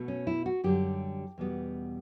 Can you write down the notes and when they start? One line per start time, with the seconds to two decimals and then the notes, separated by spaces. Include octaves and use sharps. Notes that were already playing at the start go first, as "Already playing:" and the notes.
Already playing: B2 A3
0.08 C#4
0.27 E4
0.46 F#4
0.64 F#2 D3 G3 G4
1.38 E2 B2 G3 B3